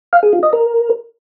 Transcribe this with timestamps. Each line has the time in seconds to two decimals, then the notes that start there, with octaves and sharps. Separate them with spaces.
0.13 F5
0.23 G#4
0.33 F4
0.43 D#5
0.53 A#4